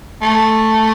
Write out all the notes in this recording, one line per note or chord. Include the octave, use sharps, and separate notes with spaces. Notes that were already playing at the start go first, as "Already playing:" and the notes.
A3